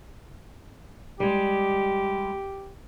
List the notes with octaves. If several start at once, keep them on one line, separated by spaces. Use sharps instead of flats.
G3 G#3 G4